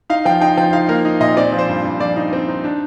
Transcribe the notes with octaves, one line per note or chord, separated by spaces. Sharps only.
D#4 F5
F3 G5
D#4 G5
F3 G5
D#4 F5
A#3 A#4
D#4
A#2 D#5
C4 D5
F3
C5
G2
G2
F3 D5
D#4
C4
D#4
D4